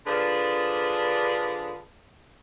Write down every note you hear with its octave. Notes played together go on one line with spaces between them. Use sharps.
D3 F3 D4 G#4 B4